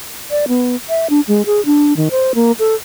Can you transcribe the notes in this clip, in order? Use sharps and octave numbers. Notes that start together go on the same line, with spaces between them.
D5
B3
E5
D4
G#3
G#4
D4
D#3
C5
A#3
A4